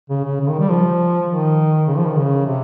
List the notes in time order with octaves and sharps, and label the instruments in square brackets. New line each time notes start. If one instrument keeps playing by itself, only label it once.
[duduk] C#3
C#3
C#3
D#3
G3
F3
D#3
C#3
F3
D#3
C#3
C3